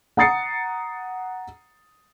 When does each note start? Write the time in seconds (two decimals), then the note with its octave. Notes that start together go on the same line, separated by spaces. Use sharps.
0.17 F#5 A#5 D#6 A6 C7 C#7